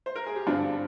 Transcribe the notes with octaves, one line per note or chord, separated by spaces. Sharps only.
C5
A#4
G#4
G4
G2 D3 F3 C4 D4 F4